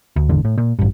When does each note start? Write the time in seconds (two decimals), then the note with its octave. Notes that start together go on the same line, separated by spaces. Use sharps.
0.16 D2
0.29 D#1 G#1 E2 D3
0.45 A2
0.58 A#2
0.79 A1 G2